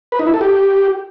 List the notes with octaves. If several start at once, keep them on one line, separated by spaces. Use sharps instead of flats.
B4
D#4
E4
A4
G4